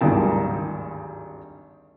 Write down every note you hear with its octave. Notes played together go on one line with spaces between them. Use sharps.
G#1 D2 G2 D#3 A5